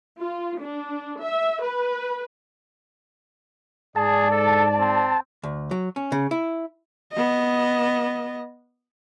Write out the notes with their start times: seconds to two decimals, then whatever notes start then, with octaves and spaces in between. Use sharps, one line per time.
0.21 F4
0.61 D4
1.20 E5
1.64 B4
3.96 G#2 G#4 D5 A5
4.31 A4
4.79 C4
5.43 D2
5.71 F#3
5.96 C#4
6.12 C#3
6.31 E4
7.13 B3 D#5